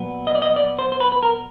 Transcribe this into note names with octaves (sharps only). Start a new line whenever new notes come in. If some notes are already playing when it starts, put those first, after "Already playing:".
Already playing: A#2 F#3 B3
D#5
D5
D#5
D5
C5
C5
B4
B4
A#4